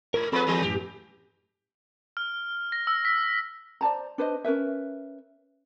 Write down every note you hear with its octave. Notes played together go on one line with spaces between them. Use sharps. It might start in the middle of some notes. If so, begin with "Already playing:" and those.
G#2 A#4
F3 G#3 C4 A4 B4 B5
E3 G3
F#2 A2 F#3 G4
F6
A#6
E6
B6
C5 D5 A5 A#5
D4 B4 C5 D#5
C#4 A#4 B4 E5